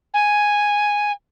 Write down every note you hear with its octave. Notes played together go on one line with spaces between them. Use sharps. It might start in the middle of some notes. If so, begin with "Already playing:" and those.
G#5